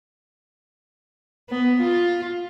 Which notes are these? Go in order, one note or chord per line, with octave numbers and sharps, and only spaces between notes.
B3
F4